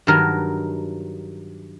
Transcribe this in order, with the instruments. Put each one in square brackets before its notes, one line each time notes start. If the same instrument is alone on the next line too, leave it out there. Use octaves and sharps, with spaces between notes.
[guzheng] G2 D#3 F#3 A#4